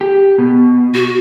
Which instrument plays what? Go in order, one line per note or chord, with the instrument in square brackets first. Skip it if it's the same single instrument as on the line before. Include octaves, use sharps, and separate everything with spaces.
[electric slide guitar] G4
B2
[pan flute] F#4